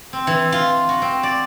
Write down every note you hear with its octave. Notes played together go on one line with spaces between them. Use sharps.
C4
E3
F4
F#4
C4
D5